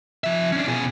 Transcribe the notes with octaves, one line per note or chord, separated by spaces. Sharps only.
F3 E5
C#4 D4
B2 G#4